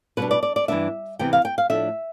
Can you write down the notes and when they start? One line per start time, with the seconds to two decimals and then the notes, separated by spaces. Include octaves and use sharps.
0.17 B2 G3 B3 D4 B4
0.31 D5
0.43 D5
0.56 D5
0.68 G2 E3 B3 D4 E5
1.19 E2 C3 E3 B3 G5
1.33 F5
1.45 G5
1.58 F5
1.70 A2 F3 A3 D4 E5